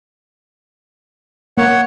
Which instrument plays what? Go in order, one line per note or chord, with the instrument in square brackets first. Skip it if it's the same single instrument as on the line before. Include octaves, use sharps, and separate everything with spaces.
[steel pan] A#3 [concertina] C#5 F#5